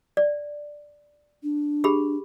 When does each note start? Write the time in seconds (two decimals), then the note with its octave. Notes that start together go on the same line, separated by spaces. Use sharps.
0.17 D5
1.43 D4
1.84 G4 G#4 B5